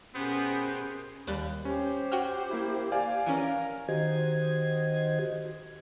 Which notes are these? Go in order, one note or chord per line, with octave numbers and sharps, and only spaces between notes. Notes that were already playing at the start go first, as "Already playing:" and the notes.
B2 B3 C#4 G4 G#4 A#4 C5
D#2 G3 F#6
C#4 G4 C5
F#4 G5 F6
A#3 E4
D5 F5 G#5
E3 C#4 A#4 A#5
D#3 F#4 G4 C5 D#5 G#6